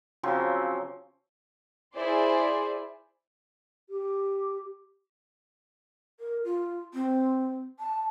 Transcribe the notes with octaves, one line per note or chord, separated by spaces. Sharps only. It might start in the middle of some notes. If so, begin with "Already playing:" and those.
C#3 F3 F#3 C4
E4 G#4 C5 D5 C6
G4
A#4
F4
C4
A5